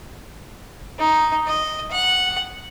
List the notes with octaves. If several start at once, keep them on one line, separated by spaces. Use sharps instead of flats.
D#4
D#5
F#5